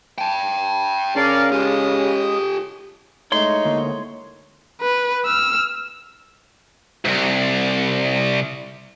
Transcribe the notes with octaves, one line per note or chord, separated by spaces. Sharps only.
G5 A5
C#3 C#4 A#4 D5 F5
G#3 F4 G4 D#6
A2 G#3 A3 D#4 C#5 C6
D2 D3 A#3
B4
E6 F6
C2 G#2